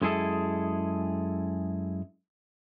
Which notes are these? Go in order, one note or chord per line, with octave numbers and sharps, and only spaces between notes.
F#2 G#3 E4 G#4 A4